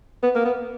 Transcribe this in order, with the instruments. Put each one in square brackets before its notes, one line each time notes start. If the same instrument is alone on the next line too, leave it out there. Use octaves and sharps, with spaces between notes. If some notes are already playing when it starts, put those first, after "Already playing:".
[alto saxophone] B3
A#3
B3